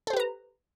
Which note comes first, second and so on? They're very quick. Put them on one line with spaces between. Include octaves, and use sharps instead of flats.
A4 C5 G4 B4 A#5